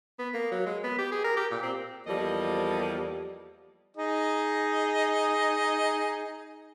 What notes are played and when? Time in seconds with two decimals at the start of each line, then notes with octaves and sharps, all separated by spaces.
0.19 B3
0.34 A#3
0.52 F#3
0.66 G#3
0.84 B3
0.99 G4
1.12 G#4
1.24 A#4
1.37 G4
1.51 A#2
1.63 C4
2.07 E2 F3 G3 A#3 A4 D#5
3.97 D#4 G#4 D#5